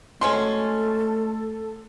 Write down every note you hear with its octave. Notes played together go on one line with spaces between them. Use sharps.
F#3 G#3 A3 C#4 A4 C6